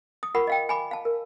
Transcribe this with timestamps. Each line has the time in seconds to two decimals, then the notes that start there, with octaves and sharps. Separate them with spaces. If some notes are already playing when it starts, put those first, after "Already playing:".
0.23 D#6
0.34 F4 A#4 F#5 B5 C#6
0.47 D#5 F5 G5
0.69 G#5 B5 D6
0.91 F5 A5
1.05 A#4